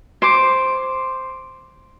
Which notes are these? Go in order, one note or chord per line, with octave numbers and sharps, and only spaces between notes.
C5 D6